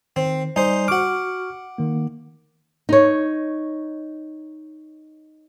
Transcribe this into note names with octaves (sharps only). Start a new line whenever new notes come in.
D#3 C4
G3 D#4 C5 D5 G#5
F#4 F#5 C#6 D6 F6
D#3 A#3
D#4 C#5